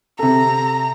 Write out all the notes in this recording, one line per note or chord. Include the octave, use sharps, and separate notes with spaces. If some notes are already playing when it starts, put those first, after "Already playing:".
C3 A4 A#5